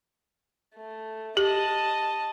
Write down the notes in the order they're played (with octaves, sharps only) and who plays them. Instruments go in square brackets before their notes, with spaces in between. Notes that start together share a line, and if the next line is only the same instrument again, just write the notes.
[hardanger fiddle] A3
[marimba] G4 [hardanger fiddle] D#5 A5